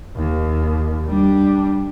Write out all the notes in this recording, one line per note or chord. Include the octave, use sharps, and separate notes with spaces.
D#2
G3 D4